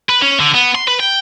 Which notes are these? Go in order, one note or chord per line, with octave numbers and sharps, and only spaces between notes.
B4
C#4
D3
B3
C6
B4
G5